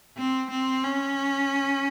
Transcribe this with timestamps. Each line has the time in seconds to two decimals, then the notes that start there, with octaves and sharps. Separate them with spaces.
0.17 C4
0.51 C4
0.84 C#4